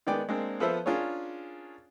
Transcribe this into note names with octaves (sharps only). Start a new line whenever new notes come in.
D#3 G#3 B3 D5 G5
G#3 A#3 C4 D4
F3 B3 A4 B4 C5 E5
C#4 D4 F4 G#4 A#4 C#5